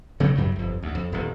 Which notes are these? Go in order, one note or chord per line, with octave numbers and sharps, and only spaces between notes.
C#3 F#3 A3 C4
F#2 F#3 G3
G1 F2
D2
F2
D#1 E2